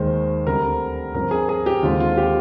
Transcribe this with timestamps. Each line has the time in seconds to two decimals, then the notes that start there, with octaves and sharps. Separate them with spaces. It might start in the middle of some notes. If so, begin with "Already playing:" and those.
Already playing: D#2 D#3 G#3 C5
0.46 D2 D3 G3 C4 A#4
1.14 G2 F3 C4 A#4
1.31 G#4
1.49 G#4
1.66 G4
1.82 D#2 D3 G#3 C4 F4
2.00 F4
2.17 G4